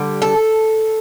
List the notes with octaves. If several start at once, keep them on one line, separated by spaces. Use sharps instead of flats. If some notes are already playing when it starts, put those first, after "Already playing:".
Already playing: D3 G3
A4